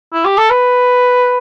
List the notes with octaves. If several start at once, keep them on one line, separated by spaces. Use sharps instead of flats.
E4
G4
A4
B4